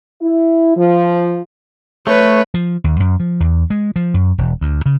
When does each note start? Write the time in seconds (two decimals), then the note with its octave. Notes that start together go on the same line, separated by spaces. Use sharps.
0.21 E4
0.77 F3
2.07 A3 B4 C#5
2.54 F3
2.84 D#2
3.00 F#2
3.20 F3
3.40 E2
3.70 G#3
3.96 F3
4.14 F#2
4.38 E1
4.61 D2
4.86 C#3